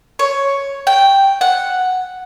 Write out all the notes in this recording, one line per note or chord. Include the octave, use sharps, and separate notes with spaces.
C#5
G5
F#5